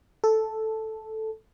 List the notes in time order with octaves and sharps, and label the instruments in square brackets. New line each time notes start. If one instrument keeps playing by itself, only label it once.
[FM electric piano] A4